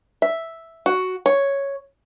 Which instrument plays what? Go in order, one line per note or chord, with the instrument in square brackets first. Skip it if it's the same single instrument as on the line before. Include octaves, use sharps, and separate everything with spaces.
[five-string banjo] E5
F#4
C#5